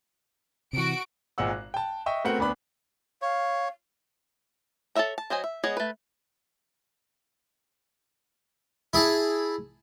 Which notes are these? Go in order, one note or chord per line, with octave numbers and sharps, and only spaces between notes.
C3 E3 F#4 D7
G#1 A#2 G#3 F#5 E6
F#6
G5 A5
D#5 E5 G5 C#6
A3 B3 C4 F#4 A#4 F#5
D2 B3 D4 B5
C#5 F5
A4 A#4 C#5 E5 A#5
A5
F#3 C5 D#5 G#5
E5
G#3 B3 G#4 C#5 D#5
A3 B4
E4 G#4 A5